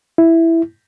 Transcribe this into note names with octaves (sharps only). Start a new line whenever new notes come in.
E4